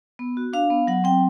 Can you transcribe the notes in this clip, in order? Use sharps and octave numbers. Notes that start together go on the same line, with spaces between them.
B3
F#4
D4 F5
B3
F#3 F#5
C4 G5